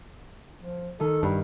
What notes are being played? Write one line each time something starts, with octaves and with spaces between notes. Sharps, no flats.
F3
D#3 A4
G2 G3